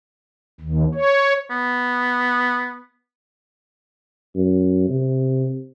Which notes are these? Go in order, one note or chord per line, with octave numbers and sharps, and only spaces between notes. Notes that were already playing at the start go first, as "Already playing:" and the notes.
D#2
C#5
B3
F#2
C3